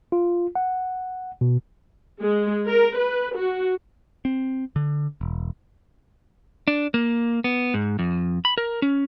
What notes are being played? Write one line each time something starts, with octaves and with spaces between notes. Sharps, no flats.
F4
F#5
B2
G#3
A#4
B4
F#4
C4
D3
E1
D4
A#3
B3
G#2
F2
B5
A#4
C#4